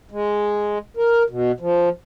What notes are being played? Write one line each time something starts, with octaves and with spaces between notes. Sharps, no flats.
G#3
A#4
B2
F3